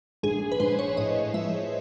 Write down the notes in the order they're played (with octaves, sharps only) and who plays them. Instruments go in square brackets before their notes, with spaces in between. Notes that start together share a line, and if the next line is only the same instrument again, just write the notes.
[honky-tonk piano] A#1 [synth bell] G#4
[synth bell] B4
[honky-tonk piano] A#1 [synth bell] C5
[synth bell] C#5
[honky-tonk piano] A2 [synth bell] D#5
[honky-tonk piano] F3 [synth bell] E5